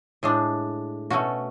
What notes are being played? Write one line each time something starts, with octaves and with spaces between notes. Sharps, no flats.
A2 G#3 D4
B2 A3 C#4 F#4